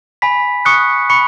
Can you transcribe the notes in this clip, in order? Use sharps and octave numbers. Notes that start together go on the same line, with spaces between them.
G#5 B5 B6
C#6 D#6 F#6 C#7
B5 C#6 C#7